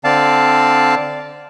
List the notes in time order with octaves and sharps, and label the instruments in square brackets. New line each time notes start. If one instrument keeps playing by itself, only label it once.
[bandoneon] D3 C4 D5 F5 A5